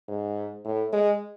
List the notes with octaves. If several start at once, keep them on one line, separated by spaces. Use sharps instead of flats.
G#2
A2
G#3